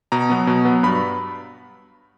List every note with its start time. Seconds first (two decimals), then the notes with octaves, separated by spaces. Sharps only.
0.12 B2 A#5
0.30 F#3 B3
0.47 B2
0.65 F#3 B3
0.83 G2 B5